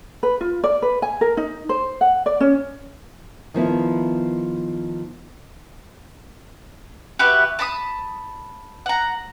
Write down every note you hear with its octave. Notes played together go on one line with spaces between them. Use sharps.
B4
F4
D5
B4
G#5
A#4
D#4
C5
F#5
D5
C#4
D#3 F3 B3 E4
F#4 G4 B4 E5
A5 B5 C6 D#6
F#5 A#5